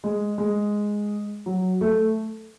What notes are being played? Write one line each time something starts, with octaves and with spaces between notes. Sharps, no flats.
G#3
G#3
F#3
A3